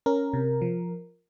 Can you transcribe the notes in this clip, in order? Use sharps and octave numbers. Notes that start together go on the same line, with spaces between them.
C#4 A#4
C3
F3